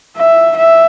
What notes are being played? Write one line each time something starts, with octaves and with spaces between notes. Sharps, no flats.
E5
E5